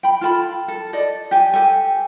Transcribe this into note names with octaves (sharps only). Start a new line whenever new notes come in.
G5 B5
F4 A4 G5 B5
A4
A4 D5 D#5
G4 G#5
G4 A4 G#5